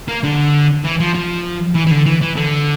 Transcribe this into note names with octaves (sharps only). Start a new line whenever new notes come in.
A#3
D3
E3
F3
F3
E3
E3
D3
E3
E3
D3